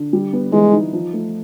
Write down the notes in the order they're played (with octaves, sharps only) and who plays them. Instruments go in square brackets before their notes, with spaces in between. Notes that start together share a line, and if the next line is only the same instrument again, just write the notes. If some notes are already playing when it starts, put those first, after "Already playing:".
Already playing: [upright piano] D3
G3
B3
[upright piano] E3 [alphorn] G#3
[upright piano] D#4
F3
A3